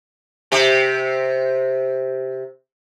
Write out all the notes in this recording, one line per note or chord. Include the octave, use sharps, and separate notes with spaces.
C3 G4